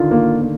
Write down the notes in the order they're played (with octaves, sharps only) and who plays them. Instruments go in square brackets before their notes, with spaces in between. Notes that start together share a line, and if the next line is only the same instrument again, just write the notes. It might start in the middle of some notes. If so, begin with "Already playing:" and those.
Already playing: [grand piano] D3 D#3 [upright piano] F4
[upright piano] A#3
A#3